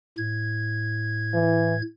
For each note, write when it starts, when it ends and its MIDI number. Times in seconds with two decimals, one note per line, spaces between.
0.18 1.82 45
0.18 1.82 92
1.34 1.75 52